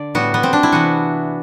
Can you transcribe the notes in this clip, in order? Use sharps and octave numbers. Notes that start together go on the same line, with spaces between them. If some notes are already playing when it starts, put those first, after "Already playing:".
Already playing: D3 D5
A2 G3 B3 F#4
B3
C4
D4
E4
C3 E3 B3 F#4